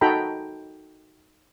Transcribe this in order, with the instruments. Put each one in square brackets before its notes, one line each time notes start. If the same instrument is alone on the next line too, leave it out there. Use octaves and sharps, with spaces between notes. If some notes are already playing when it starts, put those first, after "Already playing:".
[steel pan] D#4 F#4 A4 G5 A#5 B5